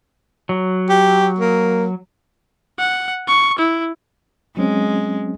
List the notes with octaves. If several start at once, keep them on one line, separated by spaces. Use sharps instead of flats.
F#3
G4
A#3
F#5
C#6
E4
F#3 G#3 C4 C#4